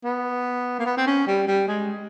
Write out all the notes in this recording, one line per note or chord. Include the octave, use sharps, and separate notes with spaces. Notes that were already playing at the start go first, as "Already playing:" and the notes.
B3
A#3
B3
C4
C#4
G3
G3
G#3